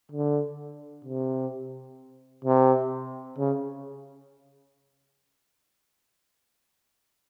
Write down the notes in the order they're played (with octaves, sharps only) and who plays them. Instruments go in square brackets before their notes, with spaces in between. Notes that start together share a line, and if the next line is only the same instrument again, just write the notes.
[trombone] D3
C3
C3
C#3